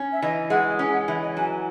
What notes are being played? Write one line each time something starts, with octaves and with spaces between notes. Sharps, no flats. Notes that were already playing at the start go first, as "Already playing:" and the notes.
Already playing: C#4
E5
E3 D#5
G#3 F#5
C#4
G#5
F#5
E3 E5
D#5
F#3 G#5